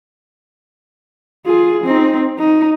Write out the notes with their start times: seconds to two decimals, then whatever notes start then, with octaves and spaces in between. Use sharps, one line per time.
1.46 F4 G#4
1.84 C4 D#4
2.39 D#4